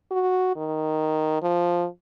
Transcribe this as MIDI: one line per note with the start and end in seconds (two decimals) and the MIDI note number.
0.11 0.52 66
0.56 1.41 51
1.42 1.87 53